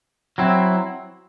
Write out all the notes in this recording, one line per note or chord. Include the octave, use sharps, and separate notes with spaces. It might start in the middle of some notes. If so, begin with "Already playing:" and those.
F#3 C4 E4